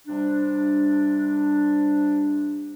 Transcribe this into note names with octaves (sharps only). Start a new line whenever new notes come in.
C3 G3 D4